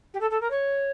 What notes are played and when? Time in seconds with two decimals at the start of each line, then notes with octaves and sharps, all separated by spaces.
0.13 G4
0.20 A4
0.30 A4
0.40 A#4
0.50 C#5